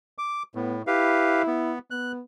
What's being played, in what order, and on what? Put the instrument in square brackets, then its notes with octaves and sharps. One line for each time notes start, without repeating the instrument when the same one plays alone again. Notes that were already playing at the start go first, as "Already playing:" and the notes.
[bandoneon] D6
[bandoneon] A2 [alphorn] B3
[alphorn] E4 [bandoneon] G4 B4 F5
[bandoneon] B3
[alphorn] B3 [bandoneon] F#6